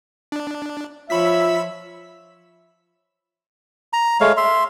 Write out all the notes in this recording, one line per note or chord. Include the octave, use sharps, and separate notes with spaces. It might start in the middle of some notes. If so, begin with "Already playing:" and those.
D4
F3 F4 C#5 E5 B5 E6 B6
A#5
G#3 A3 C#5 F5
E5 C6